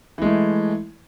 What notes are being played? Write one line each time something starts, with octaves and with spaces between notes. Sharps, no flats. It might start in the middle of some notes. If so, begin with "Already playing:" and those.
E3 G#3 A3